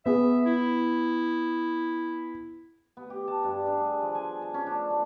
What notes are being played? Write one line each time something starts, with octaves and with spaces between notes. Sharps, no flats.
B3 G#4 E5
E4
B3
G4
A5
G2
D4
G#4
F3
G#5
A5
C#4
D4
A3